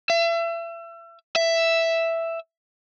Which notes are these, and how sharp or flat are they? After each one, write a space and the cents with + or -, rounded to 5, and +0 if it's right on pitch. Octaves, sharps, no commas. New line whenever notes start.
E5 +35
E5 +5